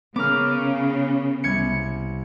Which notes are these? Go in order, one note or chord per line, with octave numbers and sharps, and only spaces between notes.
C#3 B3 A#4 D6 F6
C2 G#6 C#7